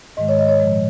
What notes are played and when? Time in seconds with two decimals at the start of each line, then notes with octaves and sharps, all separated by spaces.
0.17 G#2 D#3 G#3 D#5
0.29 C#5
0.39 D#5
0.49 C#5
0.60 A#2 F3 G#3